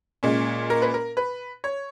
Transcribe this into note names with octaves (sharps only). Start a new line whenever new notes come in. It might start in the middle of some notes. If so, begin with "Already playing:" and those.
A#2 G#3 C#4
A#4
B4
A#4
B4
C#5